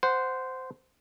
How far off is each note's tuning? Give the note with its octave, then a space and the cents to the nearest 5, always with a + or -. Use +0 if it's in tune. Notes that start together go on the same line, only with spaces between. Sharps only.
C5 -10 F#5 +0